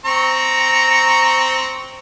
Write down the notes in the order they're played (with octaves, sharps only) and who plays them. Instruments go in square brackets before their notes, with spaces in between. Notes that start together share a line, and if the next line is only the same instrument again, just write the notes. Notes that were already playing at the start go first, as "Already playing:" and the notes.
[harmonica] C4 A#5 C#6